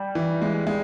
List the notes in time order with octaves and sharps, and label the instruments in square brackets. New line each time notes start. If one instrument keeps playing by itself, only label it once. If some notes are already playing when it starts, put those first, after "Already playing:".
Already playing: [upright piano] G3
[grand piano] E3
G#3
G#3